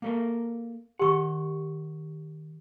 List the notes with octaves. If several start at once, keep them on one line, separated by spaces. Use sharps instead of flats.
A#3 A4 A#4
D#3 G4 F#5 C#6